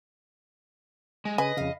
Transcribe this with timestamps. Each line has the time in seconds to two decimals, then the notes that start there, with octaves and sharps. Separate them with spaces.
1.25 G#3
1.38 C#3 B4 D#5 G#5
1.57 F2 C#3 F5